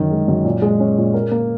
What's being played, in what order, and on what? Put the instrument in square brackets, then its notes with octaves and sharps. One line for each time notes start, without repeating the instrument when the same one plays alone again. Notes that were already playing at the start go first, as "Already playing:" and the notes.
Already playing: [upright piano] F#2 D#3
G#3
F#2
A#2
G#3
C#4
A#2
A#4
A#3